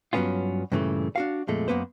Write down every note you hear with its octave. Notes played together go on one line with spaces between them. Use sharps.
G2 F#3 G3 B3 C#4 F4
G2 A#2 C#3 E3 A3
D4 F#4 F5
F2 A#2 G#3 A3
F#2 A#3 B3 B4 C5